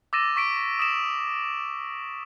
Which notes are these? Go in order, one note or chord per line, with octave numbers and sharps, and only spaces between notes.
D6 E6 A6 A#6 D#7 E7
C#6 B6 D7
D#6 B6 E7